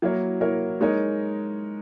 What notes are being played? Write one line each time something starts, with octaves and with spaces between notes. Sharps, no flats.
F#3 A#3 E4 A#4 C#5
F#3 A#3 E4 A#4 C#5
G#3 D#4 A#4 C#5